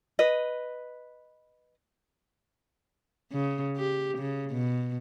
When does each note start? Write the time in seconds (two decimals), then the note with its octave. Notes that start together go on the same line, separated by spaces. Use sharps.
0.19 B4 D#5
3.32 C#3
3.77 G4
4.18 C#3
4.51 B2